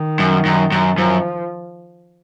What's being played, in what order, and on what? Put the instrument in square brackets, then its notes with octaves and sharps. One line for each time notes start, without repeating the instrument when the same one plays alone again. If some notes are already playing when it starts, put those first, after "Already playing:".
Already playing: [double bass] D#3
[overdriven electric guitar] F#2
F#2
F#2
[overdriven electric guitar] F#2 [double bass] F3